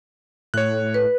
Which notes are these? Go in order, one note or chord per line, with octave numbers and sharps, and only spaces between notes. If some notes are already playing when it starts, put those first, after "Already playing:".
A2 C#5 F#6
B4